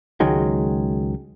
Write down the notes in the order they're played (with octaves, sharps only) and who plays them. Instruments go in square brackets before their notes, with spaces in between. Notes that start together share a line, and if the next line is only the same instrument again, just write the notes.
[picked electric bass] C#2 D#3 F#3 G#3